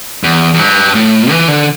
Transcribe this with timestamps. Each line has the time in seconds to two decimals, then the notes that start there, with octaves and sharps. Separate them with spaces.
0.23 E2
0.54 E2
0.59 G2
0.95 A2
1.31 E3
1.48 D3